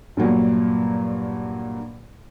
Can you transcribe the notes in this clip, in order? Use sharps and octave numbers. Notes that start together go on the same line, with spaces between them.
G2 A#2 F#3 A#3